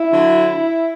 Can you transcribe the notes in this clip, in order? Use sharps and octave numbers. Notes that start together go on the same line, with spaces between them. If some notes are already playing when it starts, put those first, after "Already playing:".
Already playing: E4
D3 F#3